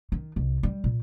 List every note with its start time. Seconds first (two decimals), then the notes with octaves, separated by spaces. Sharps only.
0.12 D#3
0.36 C2
0.63 G3
0.84 A#2